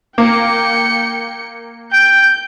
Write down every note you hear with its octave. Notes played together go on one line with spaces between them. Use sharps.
A#3 G5 C#7
G5 G6